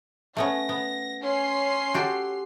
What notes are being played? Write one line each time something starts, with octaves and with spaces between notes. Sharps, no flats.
A3 B3 C#4 A#6
B3
C#4 C6 C7
F#4 G4 A4